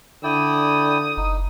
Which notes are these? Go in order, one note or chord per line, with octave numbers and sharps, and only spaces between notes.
D3 E4 D5 G5 D#6
F#1 D#4